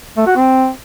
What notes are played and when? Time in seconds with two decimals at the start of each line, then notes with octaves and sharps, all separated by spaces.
0.17 A3
0.27 F#4
0.36 C4